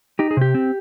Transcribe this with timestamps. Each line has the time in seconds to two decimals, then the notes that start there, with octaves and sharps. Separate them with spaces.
0.19 D#4 G4
0.31 G#4
0.37 C3 G4
0.54 C4